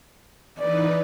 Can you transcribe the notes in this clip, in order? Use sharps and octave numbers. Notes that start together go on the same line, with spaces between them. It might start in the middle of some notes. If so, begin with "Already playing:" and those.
E3 D#4 B4 D5